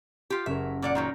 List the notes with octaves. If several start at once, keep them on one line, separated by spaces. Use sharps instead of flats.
F4 G4
F#1 C#4 A#4 E5
A#2 D5 F#5
A#2 D#3 F#3 A#5 G6